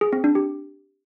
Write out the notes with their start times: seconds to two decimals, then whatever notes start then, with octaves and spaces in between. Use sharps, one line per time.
0.01 G#4
0.13 C4
0.24 D4
0.35 G4